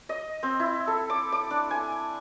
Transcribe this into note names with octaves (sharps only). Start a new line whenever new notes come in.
D#5
C4
E4
A4
D6
D6
D4
G#5